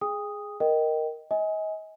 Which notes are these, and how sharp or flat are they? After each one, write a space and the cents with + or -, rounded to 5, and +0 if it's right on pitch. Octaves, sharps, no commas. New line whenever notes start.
G#4 +0 G5 +45 D#6 +0
A#4 +0 D#5 +0 G5 -10
D#5 +35 G#5 +0